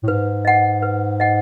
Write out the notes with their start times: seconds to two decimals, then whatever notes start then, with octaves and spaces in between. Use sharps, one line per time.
0.03 A2
0.08 G#2 B4
0.45 D#5 F#5
0.82 B4
1.20 D#5 F#5